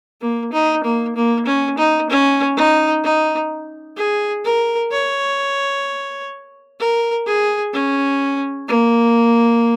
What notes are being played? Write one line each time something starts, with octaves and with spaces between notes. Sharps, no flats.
A#3
D#4
A#3
A#3
C#4
D#4
C#4
D#4
D#4
G#4
A#4
C#5
A#4
G#4
C#4
A#3